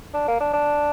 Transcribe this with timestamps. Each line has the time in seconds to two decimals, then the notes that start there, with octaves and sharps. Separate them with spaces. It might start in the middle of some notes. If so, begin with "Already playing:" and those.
0.14 D4
0.28 A#3
0.40 D4
0.53 D4